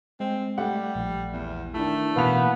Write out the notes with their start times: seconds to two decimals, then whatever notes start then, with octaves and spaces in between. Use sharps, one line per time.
0.20 G#3 C4
0.58 G3 A3 G4 F#5
0.95 A#1
1.32 E2
1.74 D#3 A3 D4 E4
2.16 B2 E3 A#3 B3 F5 F7